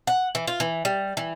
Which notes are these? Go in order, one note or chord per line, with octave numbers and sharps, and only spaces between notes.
F#5
E3
F4
E3
G3
E3